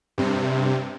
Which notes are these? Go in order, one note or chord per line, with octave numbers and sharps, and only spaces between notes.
G2 C3